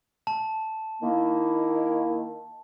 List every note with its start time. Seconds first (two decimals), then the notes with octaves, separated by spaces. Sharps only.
0.27 A5
1.02 D#3 A#3 E4